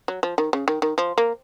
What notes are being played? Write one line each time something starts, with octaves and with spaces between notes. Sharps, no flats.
F#3
F3
D#3
C#3
D#3
D#3
F3
A#3